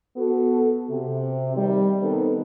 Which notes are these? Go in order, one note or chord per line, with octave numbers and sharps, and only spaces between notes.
B3 F#4 A4
C3
C3 D#3 G3
D#3 B3 C4 D#4 A4